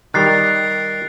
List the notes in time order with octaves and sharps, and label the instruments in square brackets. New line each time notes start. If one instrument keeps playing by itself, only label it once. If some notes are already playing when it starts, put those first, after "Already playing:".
[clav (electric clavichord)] D#3 G3 [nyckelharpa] A#4 [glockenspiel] F#6 A6 C7